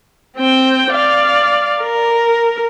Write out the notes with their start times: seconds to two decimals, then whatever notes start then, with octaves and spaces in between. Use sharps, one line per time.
0.37 C4 G5
0.91 D5 F5
1.81 A#4